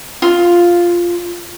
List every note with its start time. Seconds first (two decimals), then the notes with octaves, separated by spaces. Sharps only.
0.22 F4